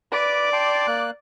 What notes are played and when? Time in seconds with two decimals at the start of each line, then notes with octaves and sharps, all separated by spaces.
0.13 B4 D5 D6
0.53 G5 A5 C6
0.87 A#3 F#6